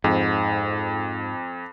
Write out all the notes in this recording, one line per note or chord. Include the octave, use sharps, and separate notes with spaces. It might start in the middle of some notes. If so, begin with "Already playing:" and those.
F2 G#2